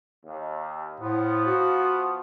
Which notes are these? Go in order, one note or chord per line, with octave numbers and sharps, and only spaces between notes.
D#2
A2 F3 B3
F#4